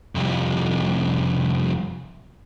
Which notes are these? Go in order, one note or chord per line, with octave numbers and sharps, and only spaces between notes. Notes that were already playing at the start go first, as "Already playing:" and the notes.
C2 F2